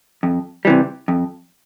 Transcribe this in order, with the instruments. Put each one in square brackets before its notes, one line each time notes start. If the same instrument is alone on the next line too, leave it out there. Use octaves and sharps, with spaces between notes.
[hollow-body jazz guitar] F2
C3 E3 G3
F2